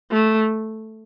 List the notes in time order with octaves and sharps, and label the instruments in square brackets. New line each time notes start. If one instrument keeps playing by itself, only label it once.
[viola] A3